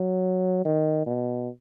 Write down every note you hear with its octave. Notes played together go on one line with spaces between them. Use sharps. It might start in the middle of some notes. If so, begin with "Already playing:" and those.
Already playing: F#3
D#3
B2